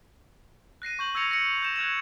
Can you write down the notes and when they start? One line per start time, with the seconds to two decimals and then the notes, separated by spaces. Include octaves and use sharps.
0.82 F#6 A#6 C7 D#7
0.99 C#6 G6 F#7
1.14 C#6 E6 G#6 A#6 C#7 F7
1.31 A#6 C#7
1.62 G6 E7
1.76 F#6 G#6 E7 F7